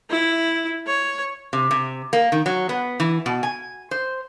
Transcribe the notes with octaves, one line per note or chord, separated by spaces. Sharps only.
E4
C#5
C3
C3
A#3
D#3
F#3
B3
E3
B2
G#5
C5